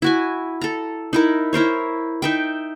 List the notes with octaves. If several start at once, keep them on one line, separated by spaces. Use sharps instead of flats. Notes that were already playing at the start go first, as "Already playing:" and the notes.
E4 F#4 G#5
A4 A#5
D#4 E4 A#4
E4 A#4 C5 C#5
D#4 E5 G5